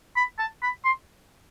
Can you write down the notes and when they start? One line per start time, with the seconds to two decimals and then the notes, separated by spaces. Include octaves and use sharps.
0.16 B5
0.39 A5
0.62 B5
0.84 C6